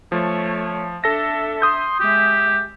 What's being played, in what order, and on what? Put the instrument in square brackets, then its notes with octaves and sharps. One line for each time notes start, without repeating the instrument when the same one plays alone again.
[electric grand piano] F3 [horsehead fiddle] A3 C#5
[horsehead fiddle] D4 E5 [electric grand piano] A4 A#6
[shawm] C6 [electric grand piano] D#6 G6
[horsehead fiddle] G#3 E5 [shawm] G4